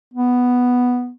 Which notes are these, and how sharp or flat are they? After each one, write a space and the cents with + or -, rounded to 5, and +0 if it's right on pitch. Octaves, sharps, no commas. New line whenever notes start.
B3 +0